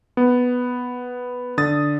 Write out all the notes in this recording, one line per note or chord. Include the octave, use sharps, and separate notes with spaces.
B3
D3 D#6 A6